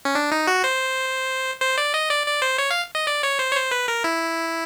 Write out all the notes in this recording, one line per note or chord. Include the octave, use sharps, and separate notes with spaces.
C#4
D4
D#4
F#4
C5
C5
D5
D#5
D5
D5
C5
C#5
F5
D#5
D5
C#5
C5
C#5
C5
B4
A#4
E4